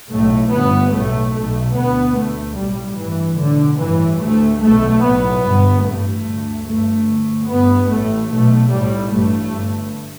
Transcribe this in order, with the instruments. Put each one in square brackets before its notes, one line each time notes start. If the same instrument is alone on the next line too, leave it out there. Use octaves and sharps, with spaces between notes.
[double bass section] B1 A2 A3
G1 G2 B3
B1 A2 A3
B1 B2 A3
D2 B3
D2 A3
B1 A2 G3
A1 G2 E3
B1 A2 D3
A1 G2 E3
D2 A3
B1 B2 A3
B1 A2 B3
G1 G2
A1 G2 A3
D2
G1 G2 A3
D2
G1 G2 B3
A1 A2 A3
B1 B2 A3
B1 A2 G3
A1 G2 A3
G1 G2